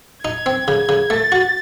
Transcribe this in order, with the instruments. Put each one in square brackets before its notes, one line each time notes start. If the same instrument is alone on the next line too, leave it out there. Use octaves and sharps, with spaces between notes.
[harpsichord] D#4 [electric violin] G#6
[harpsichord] C4
C#3
C#3
[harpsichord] A3 [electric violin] A6
[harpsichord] F#4